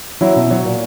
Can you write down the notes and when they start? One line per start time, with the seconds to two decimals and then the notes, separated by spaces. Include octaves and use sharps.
0.21 F#3 E4
0.36 B2
0.51 F#3 C#5
0.65 A#2